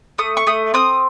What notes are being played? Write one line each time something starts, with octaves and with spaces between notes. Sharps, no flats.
A3 D#6
C#6
A3 D#6
C4 D#6